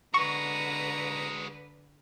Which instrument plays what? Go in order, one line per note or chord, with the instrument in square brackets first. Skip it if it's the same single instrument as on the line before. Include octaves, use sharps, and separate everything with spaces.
[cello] D3 B4 [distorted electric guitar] G#3 F#4 [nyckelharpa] A#5 [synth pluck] C#6